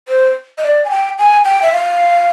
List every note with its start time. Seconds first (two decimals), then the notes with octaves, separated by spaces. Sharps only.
0.08 C5
0.58 D#5
0.64 D5
0.85 G#5
0.90 G5
1.19 G#5
1.45 G5
1.62 E5
1.72 F5